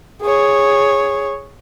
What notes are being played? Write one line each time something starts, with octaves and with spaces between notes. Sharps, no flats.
G#4 C#5